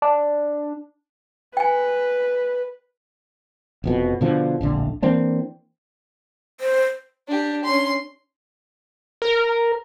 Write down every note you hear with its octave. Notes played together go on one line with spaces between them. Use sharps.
D4
B4 G5 G#5
F1 F2 B2
B2 D3 F3
D1 A#1 D3
E3 A#3 C4 D4
C5
D4 G4
C#4 C6
A#4